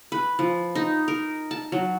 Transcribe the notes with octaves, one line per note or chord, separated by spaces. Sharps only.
B4
F3
D#4
A#4
A5
F#3